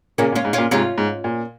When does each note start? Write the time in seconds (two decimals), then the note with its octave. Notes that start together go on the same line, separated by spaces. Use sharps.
0.18 A#2 C#3 A#3 C#4
0.32 A#2
0.35 C#4 F4
0.45 G#2
0.53 A#2 C#4 F4
0.71 G#2 C3 C#4 F4
0.98 G#2
1.24 A#2